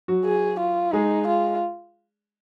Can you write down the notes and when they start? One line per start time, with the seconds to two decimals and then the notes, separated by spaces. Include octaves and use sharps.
0.08 F#3 F#4
0.25 G#4
0.59 F4
0.93 G#3 D#4 G#4
1.27 F4